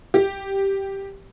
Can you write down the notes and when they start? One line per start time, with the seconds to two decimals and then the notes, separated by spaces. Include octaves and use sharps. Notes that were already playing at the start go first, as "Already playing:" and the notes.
0.14 G4